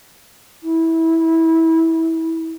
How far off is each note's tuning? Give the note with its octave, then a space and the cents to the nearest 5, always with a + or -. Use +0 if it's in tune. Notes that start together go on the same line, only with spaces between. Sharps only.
E4 -20